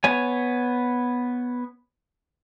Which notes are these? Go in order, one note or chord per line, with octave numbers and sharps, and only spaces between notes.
B3 C#5 G#5